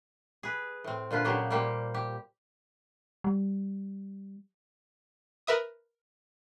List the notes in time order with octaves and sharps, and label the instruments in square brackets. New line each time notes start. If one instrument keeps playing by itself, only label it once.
[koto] G#4 B4
A2 C4
A#2 D3 F4 B4
A#2 C#3 F#3 G4 G#4
A#2 G3 A#3 G4 C5 G5
G4
[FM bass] G3
[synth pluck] A#4 B4 E5 D#6